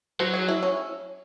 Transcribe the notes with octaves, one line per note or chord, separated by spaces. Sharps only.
F#3 C5
G#4
E4
C#4